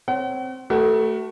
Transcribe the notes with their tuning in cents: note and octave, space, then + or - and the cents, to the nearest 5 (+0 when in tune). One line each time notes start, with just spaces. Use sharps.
C4 +0 C#5 +0 F#5 +45
A3 +0 F#4 +40 B4 -45